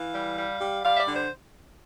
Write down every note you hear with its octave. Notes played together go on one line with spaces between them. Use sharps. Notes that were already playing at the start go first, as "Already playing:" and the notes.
Already playing: E3 F5
G3
G3
G3
G3 F5
E5
D5
D3
C5